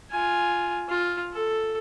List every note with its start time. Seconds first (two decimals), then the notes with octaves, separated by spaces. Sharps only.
0.11 F4 G#5
0.89 F4
1.33 A4